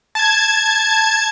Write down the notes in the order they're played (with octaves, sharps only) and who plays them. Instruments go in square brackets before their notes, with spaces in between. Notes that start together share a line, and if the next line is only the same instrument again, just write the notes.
[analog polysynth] A5 G#6